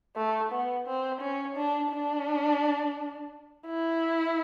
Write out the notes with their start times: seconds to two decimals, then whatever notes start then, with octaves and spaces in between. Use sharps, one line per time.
0.16 A3
0.52 B3
0.87 C4
1.21 C#4
1.57 D4
1.92 D4
3.67 E4